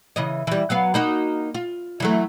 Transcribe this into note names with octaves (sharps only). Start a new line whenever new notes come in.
C#3 E3 D#5
E3 G3
F#3 B3 F5
A#3 D#4 F#4
F4
E3 F#3 A3